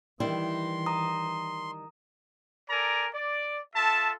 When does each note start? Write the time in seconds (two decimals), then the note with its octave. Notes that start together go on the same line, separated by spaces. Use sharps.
0.20 D#3 E3 G3 E4 C6
0.86 A#5 D#6
2.70 A4 A#4 D5 G#5 A#5
3.14 D5
3.76 F4 A4 E5 A5